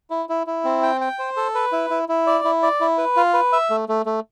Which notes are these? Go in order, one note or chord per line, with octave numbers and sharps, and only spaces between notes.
E4
E4
E4
C4
G5
G5
C5
A4
B4
E4
E4
E4
D5
E4
D5
E4
B4
F4
B4
E5
A3
A3
A3